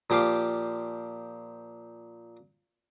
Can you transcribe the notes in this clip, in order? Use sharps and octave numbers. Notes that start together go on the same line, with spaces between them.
A#2 F3 G4 F5 D6